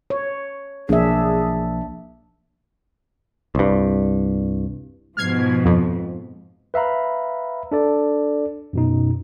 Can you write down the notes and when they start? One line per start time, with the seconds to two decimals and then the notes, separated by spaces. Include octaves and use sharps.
0.10 C#5
0.89 B1 F3 A#3 D4 G#4 E5
3.55 C2 G2
5.17 G#2 B2 F3 F6 G#6 C7
5.65 F2
6.74 B4 E5 F5 A#5 B5
7.72 D4 A4 D5
8.73 F#2 B2 D#4